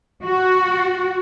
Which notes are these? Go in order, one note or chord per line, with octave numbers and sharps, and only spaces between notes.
F#4